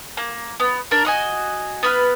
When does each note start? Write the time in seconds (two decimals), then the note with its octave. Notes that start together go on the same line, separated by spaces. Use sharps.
0.17 A#3
0.60 B3
0.91 D4 A#4
1.05 F#4 D#5 G#5
1.83 B3 B4 F6